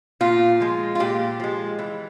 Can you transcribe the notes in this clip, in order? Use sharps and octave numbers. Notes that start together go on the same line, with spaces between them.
A#2 F4
F3 G#3
F4
A#2 G4
F3 G#3
E3